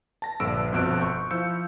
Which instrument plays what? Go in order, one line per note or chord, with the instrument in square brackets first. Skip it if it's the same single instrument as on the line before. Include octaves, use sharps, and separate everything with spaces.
[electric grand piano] A5 A#6
A#1 G2 D3 B4 E6 D7
G1 F2 B2 E6 F#6 D7
C#6 G6
F3 E4 F5 E6 G6 C#7